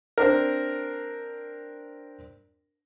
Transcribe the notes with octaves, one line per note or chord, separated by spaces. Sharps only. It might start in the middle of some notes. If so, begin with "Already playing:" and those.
C4 D4 A#4